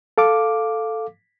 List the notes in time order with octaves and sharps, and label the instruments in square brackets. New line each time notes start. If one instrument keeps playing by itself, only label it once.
[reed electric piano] A4 F5 D6